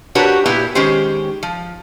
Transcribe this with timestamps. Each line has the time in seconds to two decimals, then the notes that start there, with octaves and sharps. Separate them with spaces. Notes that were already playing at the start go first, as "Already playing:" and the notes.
0.15 D4 F#4 G4 A#4 B4 C#5
0.46 A#2 B3 E4 G4
0.75 D#3 G#3 C#4 G4 C5
1.43 F3